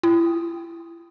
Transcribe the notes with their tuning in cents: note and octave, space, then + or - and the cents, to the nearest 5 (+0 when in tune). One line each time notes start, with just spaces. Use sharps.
E4 +35 G5 +0 D#6 +0